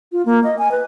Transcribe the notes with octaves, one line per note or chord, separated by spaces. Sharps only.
F4
A#3
D#5
G#5
B4